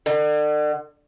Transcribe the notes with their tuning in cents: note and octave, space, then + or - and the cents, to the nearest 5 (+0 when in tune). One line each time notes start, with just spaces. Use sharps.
D3 +40